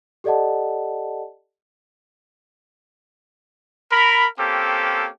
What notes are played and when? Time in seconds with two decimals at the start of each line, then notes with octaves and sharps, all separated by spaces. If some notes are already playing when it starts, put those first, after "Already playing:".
0.24 G4 A4 D5 D#5 F#5 A5
3.92 A#4 B5
4.39 A#3 C4 C#4 G4 A4